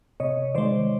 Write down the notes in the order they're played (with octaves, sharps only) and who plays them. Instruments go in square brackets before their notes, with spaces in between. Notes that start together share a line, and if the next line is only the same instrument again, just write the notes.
[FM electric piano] C3 C#5 D#5
D#3 G#3 C5 D5